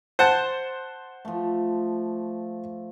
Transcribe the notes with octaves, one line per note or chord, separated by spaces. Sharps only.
C5 F#5 A5
F3 A3